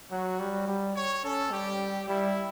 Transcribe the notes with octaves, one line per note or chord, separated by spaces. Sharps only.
F#3 F#4
G3
G3
C#5
C#4 A4
G3 G4
G3 E4